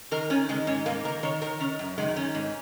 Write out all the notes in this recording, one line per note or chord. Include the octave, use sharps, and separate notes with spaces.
D#3 A#4
D#3 C#4
D#3 G#3
G#2 C#4
G#2 A#3
D#3 A#4
D#3 C#5
D#3 A#4
D#3 C#4
F#2
D#3 G#3
D#3 C#4
G#2